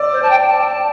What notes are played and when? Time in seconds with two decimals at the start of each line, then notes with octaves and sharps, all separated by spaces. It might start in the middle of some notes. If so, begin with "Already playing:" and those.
Already playing: D5 D6 E6
0.12 C5
0.22 A5
0.29 G5
0.40 G5
0.47 A5
0.61 G5
0.66 A5